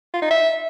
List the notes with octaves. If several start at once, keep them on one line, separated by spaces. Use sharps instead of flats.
F4
D#4
E5